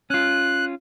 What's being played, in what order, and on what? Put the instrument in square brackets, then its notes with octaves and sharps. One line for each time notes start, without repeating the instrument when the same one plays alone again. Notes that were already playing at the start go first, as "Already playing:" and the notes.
[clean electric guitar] C#4 F4 [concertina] F#6